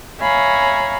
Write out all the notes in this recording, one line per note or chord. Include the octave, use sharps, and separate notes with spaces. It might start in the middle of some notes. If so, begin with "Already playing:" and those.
C#5 E5 F5 G#5 A#5 B5